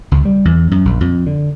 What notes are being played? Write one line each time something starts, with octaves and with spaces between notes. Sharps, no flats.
C#2
G3
E2
F#2
A#1
F2
D3